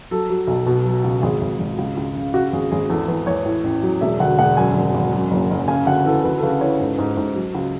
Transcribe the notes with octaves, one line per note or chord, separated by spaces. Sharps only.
F#3 A4
F#3
B1
B2
F#3
C#2
G#1 G#4
G#1
G#1
C#2
C#2
C#3
C#3 F#4
G#1 G#4
G#1 G#4
E2 A4
E2 B4
E2 C#5
A2
A1
F#3
E1 E5
D2 F#5
E1 F#5
F#2 G#5
G#1
G#1
F#2
F#1
F#1
C#3 G#5
D2 F#5
E3 A4
D2 B4
A4
C#3 B4
E3 C#5
G#2 A4
G#2
G#2
F#3
C#2